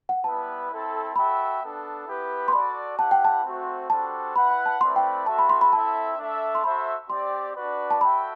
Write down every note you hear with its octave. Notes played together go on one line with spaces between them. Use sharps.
F#5
G3 B3 E4 B4 A5
C4 E4 A4
F#4 A4 E5 G5 B5
B3 D4 A4
B3 E4 G4 B4
C6
F#4 A4 D5 B5
E4 G4 B4 F#5 A5
G5
A5
A3 C4 F#4 C5
G3 D4 F#4 A4 C5 A5
E4 B4 F#5 B5
B5
A5
A3 C4 E4 B4 D5 C6
G5
C4 F#4 A4 E5 A5
B5
C6
B5
C4 E4 A4 E5 A5
A3 D4 A4 E5
C6
F#4 A4 C5 E5 B5
C4 G4 D5 C6
D4 F#4 B4 D5
A5
F#4 A4 E5 G5 B5